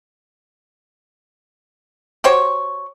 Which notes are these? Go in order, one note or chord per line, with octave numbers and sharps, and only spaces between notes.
F#4 G4 C5 C#5